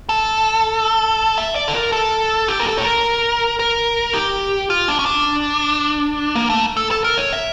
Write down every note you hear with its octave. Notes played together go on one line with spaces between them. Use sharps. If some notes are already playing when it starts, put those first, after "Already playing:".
A4
E5
D5
A4
A#4
A4
G4
A#4
A4
C#5
A#4
A#4
G4
F4
D4
C#4
D4
A#3
A3
A4
A4
A#4
C#5
E5